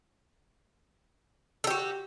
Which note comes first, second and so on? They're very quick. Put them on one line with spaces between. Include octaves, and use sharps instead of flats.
A4 G4 F#4